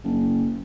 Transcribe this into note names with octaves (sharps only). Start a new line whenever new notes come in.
F#1